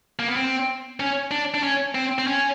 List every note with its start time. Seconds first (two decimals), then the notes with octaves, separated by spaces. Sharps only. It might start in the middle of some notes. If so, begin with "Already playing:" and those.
0.19 A#3
0.28 B3
0.36 C4
1.00 C#4
1.31 D4
1.54 D4
1.63 C#4
1.95 C4
2.19 C4
2.27 C#4